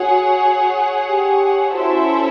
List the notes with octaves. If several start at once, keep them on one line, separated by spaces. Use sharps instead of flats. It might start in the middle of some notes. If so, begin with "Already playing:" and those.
Already playing: F#4 G#4 C#5 F#5
G4
C#4 E4 F#4 A4 C5 E5